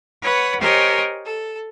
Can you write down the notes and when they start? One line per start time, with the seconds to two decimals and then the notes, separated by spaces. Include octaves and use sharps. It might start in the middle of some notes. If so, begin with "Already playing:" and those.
0.22 B4 C#5 F#5
0.59 G4 A#4 C5 C#5 D#5 G#5
1.25 A4